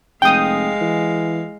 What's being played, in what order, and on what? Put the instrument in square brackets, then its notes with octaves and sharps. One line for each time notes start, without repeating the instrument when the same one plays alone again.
[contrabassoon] F1 [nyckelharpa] G#3 F5 [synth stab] G5 D#6
[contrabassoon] E3